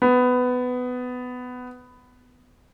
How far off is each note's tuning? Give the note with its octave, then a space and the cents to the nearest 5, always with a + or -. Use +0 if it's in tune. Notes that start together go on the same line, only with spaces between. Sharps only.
B3 +15